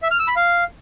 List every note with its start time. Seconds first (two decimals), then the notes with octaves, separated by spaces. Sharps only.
0.03 E5
0.11 F6
0.19 E6
0.28 B5
0.36 F5